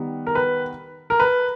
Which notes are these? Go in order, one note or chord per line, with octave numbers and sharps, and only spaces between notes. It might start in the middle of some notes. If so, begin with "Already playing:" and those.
Already playing: D#3 G3 B3
A#4
B4
A#4
B4